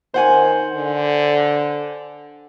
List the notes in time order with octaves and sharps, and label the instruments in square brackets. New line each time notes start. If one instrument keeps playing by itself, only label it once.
[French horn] D#3 [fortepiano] C5 F#5 G#5
[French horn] D3